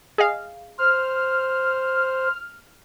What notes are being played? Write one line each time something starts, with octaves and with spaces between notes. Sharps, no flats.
G#4 D#5 F5
C5 F6